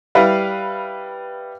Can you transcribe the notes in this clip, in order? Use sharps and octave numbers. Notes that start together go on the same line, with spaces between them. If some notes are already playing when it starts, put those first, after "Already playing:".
G3 E4 B4 F5